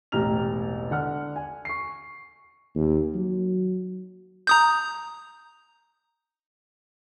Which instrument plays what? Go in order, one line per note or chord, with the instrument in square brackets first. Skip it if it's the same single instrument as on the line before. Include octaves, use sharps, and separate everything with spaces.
[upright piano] E1 A1 C3 A#5 F6 F7
D3 F#5 F6
G#5
C#6 C7
[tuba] D#2
F#3
[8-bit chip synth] A#5 D#6 G6